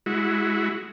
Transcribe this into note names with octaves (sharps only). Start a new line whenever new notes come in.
G#3 E4 F#4